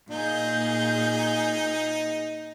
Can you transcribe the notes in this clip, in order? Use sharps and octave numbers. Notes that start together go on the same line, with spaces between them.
A#2 D#4 G#4 G6